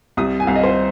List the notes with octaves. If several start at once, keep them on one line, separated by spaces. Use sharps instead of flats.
C2 D#6
G#5
C2 F5
D#5
C5